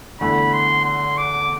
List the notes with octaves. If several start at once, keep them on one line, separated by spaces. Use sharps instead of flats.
E2 D3 A3 E4 B5
C6
C6
D6